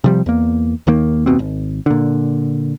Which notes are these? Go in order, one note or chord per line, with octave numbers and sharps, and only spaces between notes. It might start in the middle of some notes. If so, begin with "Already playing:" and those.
C3 F3 G3
E2 A#3
D#2 D#3 A#3
F#1 D#2 B2 C4
G#1
A#2 D3